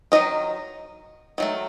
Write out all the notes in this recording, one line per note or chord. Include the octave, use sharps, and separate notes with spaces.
D#3 F#3 A#3 D#4 D#5
D#3 F#3 A3